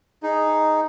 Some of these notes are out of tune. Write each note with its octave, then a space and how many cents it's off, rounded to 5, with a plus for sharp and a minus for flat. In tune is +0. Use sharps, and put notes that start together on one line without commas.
D#4 +0 G#4 +0